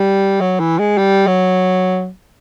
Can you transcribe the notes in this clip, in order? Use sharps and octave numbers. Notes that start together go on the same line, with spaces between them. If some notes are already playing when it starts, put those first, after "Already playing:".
Already playing: G3
F#3
E3
G#3
G3
F#3